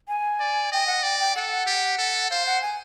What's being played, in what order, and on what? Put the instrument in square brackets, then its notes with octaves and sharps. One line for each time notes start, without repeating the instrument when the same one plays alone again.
[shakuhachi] G#5
[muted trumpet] D5
[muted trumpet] D#5 [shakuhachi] G5
[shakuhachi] F#5
[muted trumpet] D5 [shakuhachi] G5
[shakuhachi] G5
[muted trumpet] A4 [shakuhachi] F#5
[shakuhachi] F#5
[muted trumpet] G4
A4
[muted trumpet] C5 [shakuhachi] F5
[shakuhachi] F#5
G#5